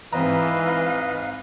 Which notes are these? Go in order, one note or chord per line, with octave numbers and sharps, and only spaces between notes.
G#2 E3 C4 B4 D#5 F5 A#5